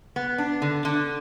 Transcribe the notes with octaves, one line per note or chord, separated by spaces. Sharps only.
B3
D4
D3
D3